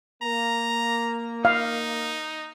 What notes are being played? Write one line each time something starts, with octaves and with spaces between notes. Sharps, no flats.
A#3 A#5
D#4 F5